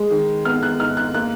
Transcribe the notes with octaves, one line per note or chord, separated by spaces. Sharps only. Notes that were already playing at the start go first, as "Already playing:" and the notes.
Already playing: G#3
D#3
B3 F6
F#6
G#2 F6
F#6
A#3 F#6